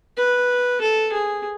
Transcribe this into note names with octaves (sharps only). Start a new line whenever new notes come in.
B4
A4
G#4